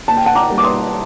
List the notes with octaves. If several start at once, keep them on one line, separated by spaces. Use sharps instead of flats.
A#2 A5
G5
F#5 A5
A#5 D6
G3 A#3
D6
C6 D#6